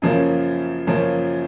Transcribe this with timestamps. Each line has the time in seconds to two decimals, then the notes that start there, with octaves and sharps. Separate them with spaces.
0.02 F#2 C#3 F3 A#3 C#4
0.87 F#2 C#3 F3 A#3 C#4